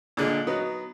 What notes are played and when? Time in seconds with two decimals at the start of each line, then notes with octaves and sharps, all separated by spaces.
0.17 A#2 D3 G#3
0.47 F#3 B3 D#4